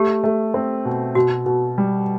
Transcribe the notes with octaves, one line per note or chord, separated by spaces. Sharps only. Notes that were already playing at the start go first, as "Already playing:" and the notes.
Already playing: A3 G4
A3
C4
B2
B2 F#4
B2
G3